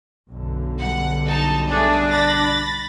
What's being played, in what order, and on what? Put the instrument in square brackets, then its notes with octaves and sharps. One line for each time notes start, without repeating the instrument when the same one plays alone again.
[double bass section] B1 F#2 D3
[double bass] G3 [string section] F#5
[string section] D#4 A5
[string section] A3 G#4 [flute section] D4
[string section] B5 A6 A#6